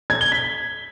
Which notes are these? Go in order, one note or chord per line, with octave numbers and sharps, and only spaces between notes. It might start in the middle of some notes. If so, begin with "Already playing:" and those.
G#6
G7
B6